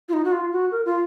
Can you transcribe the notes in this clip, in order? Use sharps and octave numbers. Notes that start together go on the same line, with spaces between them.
F4
D#4
F#4
F4
F#4
A#4
F4